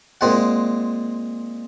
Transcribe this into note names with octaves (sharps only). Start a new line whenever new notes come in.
A#2 G#3 C4 F#5